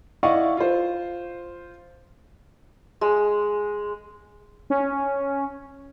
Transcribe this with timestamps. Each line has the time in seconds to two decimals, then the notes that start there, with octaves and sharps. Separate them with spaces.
0.23 E4 D5 D#5 F5 F#5 C#6
0.57 F4 C5
3.01 G#3
4.70 C#4